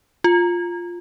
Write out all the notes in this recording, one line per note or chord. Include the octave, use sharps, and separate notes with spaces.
F4